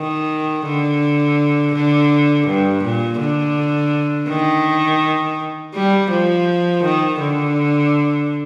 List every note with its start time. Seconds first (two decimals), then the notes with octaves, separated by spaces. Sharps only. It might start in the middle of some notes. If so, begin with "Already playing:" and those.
Already playing: D#3
0.66 D3
1.74 D3
2.47 G2
2.83 A#2
3.20 D3
4.29 D#3
5.75 G3
6.11 F3
6.83 D#3
7.20 D3